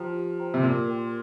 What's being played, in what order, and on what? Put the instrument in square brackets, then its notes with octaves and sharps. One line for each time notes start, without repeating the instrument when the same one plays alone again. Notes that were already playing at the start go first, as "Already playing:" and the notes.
Already playing: [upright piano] F3 [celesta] G4 C5 G5 A#5
[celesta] G4
C5 G5 A#5
[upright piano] C3
[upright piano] A#2 [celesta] G4
[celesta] A#4 G5 C6